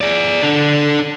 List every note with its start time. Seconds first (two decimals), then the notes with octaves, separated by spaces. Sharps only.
0.01 G#4 D5
0.43 D4 A4